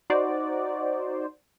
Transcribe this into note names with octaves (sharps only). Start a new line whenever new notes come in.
D#4 F#4 C5 D5